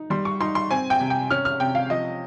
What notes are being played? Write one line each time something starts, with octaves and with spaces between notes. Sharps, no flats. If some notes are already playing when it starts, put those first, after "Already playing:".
Already playing: D#4
G3 C6
C#6
D#4 C6
C6
C4 G#5
G5
C3
G5
C#4 F6
F6
C3 G5
F5
F3 D#5